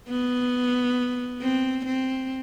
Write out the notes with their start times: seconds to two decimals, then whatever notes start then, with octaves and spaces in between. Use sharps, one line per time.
0.09 B3
1.41 C4
1.86 C4